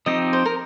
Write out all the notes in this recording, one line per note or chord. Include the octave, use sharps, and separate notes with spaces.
F3 C4 D#4 G4 D#5
C5
A#4